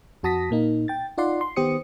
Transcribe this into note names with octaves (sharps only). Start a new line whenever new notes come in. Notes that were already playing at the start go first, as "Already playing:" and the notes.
F2 F#4 A5 D#6 A#6 B6
A#2 A#3 D#4
G5 A6
D#4 F4 D5 F#5 C6
C6
D#3 B3 G4 C5 D#6 C#7